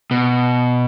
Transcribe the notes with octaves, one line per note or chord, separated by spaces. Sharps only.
B2